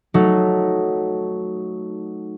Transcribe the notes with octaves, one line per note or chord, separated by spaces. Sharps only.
F#3 A3 D#4